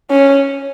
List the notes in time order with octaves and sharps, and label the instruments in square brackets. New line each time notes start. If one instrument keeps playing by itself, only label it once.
[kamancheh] C#4